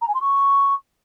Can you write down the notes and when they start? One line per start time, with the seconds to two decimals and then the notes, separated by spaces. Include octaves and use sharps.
0.01 A#5
0.08 G#5
0.14 C6
0.21 C#6